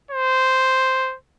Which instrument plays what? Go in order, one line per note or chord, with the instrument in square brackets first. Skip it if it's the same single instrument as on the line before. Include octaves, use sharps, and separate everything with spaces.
[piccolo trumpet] C5